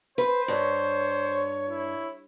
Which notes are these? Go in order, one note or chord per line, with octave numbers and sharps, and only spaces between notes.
B4 C5
G2 C#5
E4